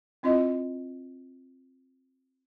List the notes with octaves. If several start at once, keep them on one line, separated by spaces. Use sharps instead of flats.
C4 E4 F4 D#5